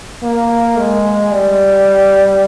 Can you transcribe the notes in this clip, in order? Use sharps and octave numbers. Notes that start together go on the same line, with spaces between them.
A#3
G#3
G3